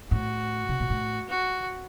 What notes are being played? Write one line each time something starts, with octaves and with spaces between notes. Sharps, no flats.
A2 F#4
C3
A#2
A2
F#4